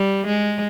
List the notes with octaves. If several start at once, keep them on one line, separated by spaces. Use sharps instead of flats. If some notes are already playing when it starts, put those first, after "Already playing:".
Already playing: G3
G#3